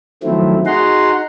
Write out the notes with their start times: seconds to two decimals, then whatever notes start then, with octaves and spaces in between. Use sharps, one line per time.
0.23 D#3 F3 F#3 A3 C4 E4
0.66 D#4 F#4 G#4 F#5 A#5 C6